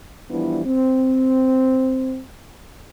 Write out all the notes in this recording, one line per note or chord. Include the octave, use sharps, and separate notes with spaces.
E3 F3 G3 B3 D4 E4
C4